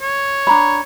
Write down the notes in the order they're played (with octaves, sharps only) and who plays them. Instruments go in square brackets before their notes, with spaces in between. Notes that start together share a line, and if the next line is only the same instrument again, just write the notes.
[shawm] C#5
[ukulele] D4 A#5 B5